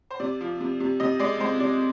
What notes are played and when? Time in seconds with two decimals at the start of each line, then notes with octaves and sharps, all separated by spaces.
0.11 C5
0.20 C3 D5
0.41 F3
0.61 C3
0.81 C3
1.00 C3 D#5
1.20 G#3 D5
1.40 G#3 C5
1.60 C3 D5